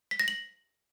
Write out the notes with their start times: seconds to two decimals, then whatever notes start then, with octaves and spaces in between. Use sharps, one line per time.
0.11 B6
0.20 A#6
0.28 F#7